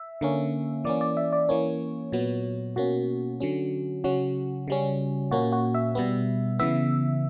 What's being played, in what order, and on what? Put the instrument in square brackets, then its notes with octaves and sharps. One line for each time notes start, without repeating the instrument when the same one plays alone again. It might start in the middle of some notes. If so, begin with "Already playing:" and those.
Already playing: [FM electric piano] E5
D3 A#3 C#4
E3 A#3 C#4 D5
D5
E5
D5
E3 A#3 C#4 C#5
A#2 F#3 B3
B2 A#3 C#4 F#4
D3 F#3 C#4
C#3 F#3 C#4 F#4
C#3 G3 C#4
A#2 A#3 C#4 F#4
F#4
E5
B2 G3 B3
C#3 E3 B3 E5